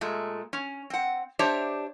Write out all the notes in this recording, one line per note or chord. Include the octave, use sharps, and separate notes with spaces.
A#2 G#3 A3
C#4
C4 F#5
D4 G4 C5 C#5 E5